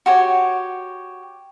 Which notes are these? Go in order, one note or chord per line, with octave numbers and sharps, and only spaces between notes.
F#4 G4 C#5